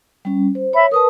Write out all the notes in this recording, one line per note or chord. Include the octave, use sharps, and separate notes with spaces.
G3 C#4
C5
C#5 E5 B5
A#4 B4 A5 D#6